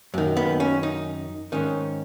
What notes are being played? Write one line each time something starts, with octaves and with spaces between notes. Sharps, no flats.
F#2 D#3
B3
C#4
D#4
G#2 D#3 C#4